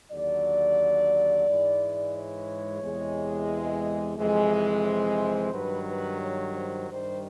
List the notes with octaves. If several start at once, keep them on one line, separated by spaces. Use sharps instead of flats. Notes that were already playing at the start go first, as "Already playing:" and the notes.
D#2 D3 F#3 D5
G#2 E3 G#3
C#5
E2 C3 E3 G#3
F2 C3 E3 G#3
C5
G2 D#3 F#3 B4
B4
C#5
C5
G2 D#3 G3 C5